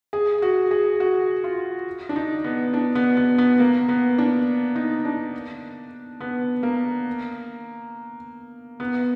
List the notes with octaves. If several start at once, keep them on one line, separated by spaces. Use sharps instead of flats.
G#4
F#4
G#4
F#4
F4
D4
D#4
B3
D4
B3
B3
B3
A#3
B3
D4
D#4
D4
B3
A#3
B3